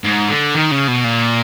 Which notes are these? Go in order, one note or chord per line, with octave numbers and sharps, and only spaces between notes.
G#2
D3
D#3
C#3
B2
A#2